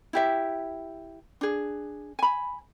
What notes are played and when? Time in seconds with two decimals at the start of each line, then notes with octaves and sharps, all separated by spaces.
0.13 E4 G4 E5
1.41 D4 G#4
2.19 G#5 B5